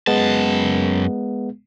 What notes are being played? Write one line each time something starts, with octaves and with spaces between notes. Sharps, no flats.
F#2 G#3 B3 A5